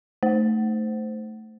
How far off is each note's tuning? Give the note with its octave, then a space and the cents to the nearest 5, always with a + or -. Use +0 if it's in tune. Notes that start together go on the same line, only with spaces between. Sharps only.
A3 +0 C5 -10